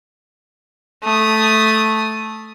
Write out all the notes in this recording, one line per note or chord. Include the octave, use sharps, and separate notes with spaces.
A3 D#6